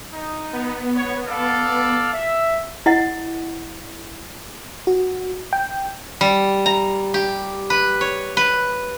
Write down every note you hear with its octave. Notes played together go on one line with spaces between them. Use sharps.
D#4
B3
C#5
A4 D5 F5
E5
E4 D#5 F#5
F#4
G5
G3
A#5
G4
B4
C#5
B4